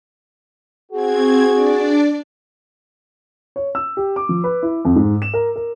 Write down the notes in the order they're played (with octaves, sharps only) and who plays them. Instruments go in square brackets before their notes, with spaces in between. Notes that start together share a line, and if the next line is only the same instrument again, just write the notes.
[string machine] C4 G#6 [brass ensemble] F#4 G#4
[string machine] D4 D5
[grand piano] C#5
E6
G4
D6
F3
B4
E4
F2
G#2
E7
A#4
A#4